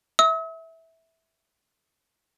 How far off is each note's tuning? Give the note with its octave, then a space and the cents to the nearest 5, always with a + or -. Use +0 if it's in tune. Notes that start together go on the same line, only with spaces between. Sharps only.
E5 -15 E6 -45